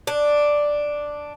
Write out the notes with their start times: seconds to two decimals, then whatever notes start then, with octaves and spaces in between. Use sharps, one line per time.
0.07 D4